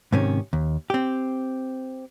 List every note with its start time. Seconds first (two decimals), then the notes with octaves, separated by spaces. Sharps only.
0.12 G#2 C3 D#3 C#4
0.53 D#2
0.90 C4 G4